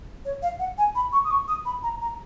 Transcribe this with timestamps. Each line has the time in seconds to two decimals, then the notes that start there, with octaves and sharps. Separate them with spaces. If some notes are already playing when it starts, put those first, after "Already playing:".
0.25 C#5
0.42 F5
0.59 F#5
0.78 G#5
0.95 B5
1.12 C#6
1.24 D#6
1.31 C#6
1.48 D#6
1.65 B5
1.83 A#5
2.01 A#5